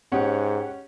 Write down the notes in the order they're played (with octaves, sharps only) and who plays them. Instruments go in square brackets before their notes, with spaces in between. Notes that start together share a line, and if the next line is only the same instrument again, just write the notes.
[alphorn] G#2 [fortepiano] C#4 [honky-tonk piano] G4 F#5